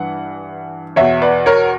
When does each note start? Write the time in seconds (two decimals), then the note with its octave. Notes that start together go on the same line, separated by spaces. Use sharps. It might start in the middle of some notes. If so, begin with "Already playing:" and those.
Already playing: G2 E3 F#5
0.96 E2 B2 C#5 E5
1.22 B4 D5
1.46 A#4 C#5